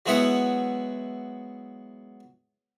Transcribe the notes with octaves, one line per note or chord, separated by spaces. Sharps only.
F#3 G#3 B3 E4 F#5